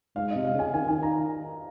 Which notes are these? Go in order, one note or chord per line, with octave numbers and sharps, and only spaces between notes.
G#2 F5
D#5
C3
F5
C#3 G#5
D#3 G#5
D#3 G#5
A#5